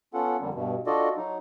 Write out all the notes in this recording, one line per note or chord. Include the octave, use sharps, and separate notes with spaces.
B3 C#4 F4 A4 F#5
F2 D3 G3 A#3
G2 B2
D4 F4 F#4 A4 D5 D#5
F#3 D#4